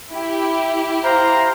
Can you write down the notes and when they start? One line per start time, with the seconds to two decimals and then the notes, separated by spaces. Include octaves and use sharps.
0.12 E4 G4
1.04 C5 F5 A#5